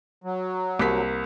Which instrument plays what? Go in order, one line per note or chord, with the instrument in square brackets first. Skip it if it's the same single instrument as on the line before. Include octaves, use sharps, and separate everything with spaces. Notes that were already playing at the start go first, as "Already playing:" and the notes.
[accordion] F#3
[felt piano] C2 A#3 B6